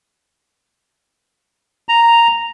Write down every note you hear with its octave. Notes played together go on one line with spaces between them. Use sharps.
A#5